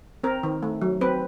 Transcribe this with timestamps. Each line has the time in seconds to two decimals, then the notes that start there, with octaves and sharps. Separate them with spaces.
0.23 C4 A#4
0.43 D#3
0.63 A3
0.82 F#3
1.01 C4 B4